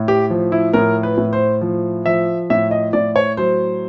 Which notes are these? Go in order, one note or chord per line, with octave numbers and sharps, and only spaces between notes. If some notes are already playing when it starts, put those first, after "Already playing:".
Already playing: A2
G4
F3
E4
A2 A#4
B4
A2
C5
F3
F3 E5
A2 E5
D#5
A2 D5
C#5
F#3 C5